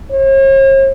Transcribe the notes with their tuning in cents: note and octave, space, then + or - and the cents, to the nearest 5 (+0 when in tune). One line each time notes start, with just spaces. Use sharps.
C#5 -45